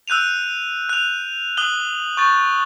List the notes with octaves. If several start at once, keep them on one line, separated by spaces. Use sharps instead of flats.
E6 F#6 G6 D#7 F7
F#6 F7
D#6 F#6 F#7 G7
C#6 G6 A6